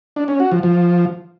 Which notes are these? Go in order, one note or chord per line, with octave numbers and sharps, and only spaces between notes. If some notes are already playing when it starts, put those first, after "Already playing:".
D4
C#4
F#4
F3
F3